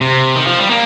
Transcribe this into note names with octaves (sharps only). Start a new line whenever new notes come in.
C3
D#3
F3
G3
A#3